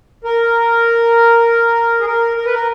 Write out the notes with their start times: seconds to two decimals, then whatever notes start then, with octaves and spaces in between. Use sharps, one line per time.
0.24 A#4
2.00 G#4
2.07 A#4
2.37 A#4
2.46 B4
2.54 A#4